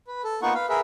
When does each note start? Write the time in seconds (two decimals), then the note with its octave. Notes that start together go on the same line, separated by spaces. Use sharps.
0.07 B4
0.24 A4
0.42 A#3 B3 D#4 F4 F#5 C#6
0.54 B4 F5
0.69 G#4 A#4 B4 E5